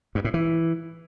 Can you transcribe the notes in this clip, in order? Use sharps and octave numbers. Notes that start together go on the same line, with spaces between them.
G2
A2
E3